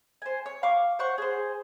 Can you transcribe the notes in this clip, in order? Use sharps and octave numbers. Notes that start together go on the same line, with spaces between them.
C5 G#5
C#5
F5 C#6 D6
C5 C#5 F#5 C#6
G#4 C5